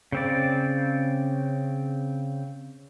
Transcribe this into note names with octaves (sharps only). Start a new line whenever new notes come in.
C#3 C4 D5